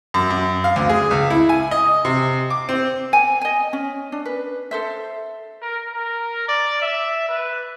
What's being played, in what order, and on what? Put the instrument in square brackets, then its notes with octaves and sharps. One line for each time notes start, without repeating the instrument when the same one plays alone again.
[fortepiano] F#2
F#2
F5
D2
G#4
C#2
E4
G#5
D#5
C3
D6
C4
[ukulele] G#5
D#5 G#5
C#4
D4
B4
A4 C5 E5
[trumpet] A#4
A#4
D5
E5
B4